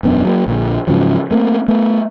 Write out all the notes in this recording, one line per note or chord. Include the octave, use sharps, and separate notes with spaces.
E1 F#2 B3 D4
F#3 A#3
A#1 A#2 D3
G#2 C#3 F3 F#3
A3 A#3 C4
A3 B3